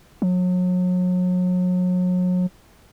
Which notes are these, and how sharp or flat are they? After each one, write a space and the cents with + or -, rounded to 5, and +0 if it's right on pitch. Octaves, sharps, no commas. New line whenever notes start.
F#3 -35